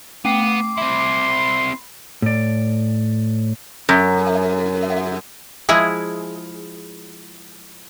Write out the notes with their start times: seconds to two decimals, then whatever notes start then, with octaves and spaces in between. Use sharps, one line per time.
0.25 A3 B3 G5 D6 C7
0.78 C4 E4 B5 C6
2.22 A2 D5
3.89 F#2
5.69 F3 G#3 E4 G#4